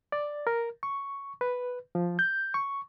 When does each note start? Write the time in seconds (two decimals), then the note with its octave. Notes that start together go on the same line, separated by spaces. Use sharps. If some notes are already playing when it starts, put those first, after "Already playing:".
0.12 D5
0.47 A#4
0.83 C#6
1.41 B4
1.95 F3
2.19 G6
2.54 C#6